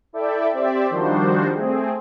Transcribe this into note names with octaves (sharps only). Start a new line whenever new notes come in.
E4 A4 D5 E5 G5
C4 G4 C5 D5 E5
D#3 F3 G3 D4 F#4 C5
A3 C4 G#4